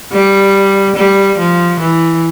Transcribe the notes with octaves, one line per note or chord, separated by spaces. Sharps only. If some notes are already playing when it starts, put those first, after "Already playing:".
G3
G3
F3
E3